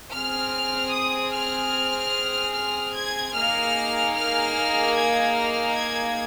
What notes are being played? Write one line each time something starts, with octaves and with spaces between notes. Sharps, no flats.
C4 G#4 F6
D#6
F6
F6
G#6
A#3 D#4 G#4 F6
F6
G#6
F6
G#6